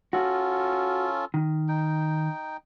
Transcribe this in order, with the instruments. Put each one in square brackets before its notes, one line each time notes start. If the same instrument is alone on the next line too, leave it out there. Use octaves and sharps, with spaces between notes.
[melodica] C#4 F4 A4 [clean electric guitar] F#4
[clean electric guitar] D#3
[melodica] D#4 G5